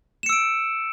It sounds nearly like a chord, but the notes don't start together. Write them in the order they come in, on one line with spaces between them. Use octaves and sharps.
E7 C#7 E6 D7